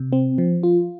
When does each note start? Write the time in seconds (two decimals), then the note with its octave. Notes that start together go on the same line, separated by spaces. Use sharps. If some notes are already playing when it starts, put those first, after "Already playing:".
Already playing: C3
0.13 C4
0.38 F3
0.63 F4